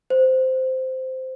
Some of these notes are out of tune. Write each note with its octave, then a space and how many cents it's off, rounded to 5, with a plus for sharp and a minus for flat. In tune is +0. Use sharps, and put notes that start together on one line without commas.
C5 -10